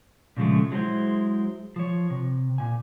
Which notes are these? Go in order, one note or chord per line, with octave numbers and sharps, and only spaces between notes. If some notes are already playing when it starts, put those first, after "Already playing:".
A#2 C#3 F3 G#3 A3
F#3 G#3 E4 G#4 C5
F3 C#5
C3
A#2 G#5